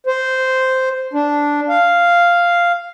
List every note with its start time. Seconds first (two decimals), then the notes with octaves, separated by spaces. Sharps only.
0.07 C5
1.13 D4
1.69 F5